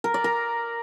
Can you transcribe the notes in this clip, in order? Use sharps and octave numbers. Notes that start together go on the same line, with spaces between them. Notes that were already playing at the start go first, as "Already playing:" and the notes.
A#4
D5
A#4